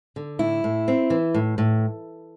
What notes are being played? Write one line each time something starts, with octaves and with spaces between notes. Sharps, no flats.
D3
A2 E4
A2
C4
E3
A2
A2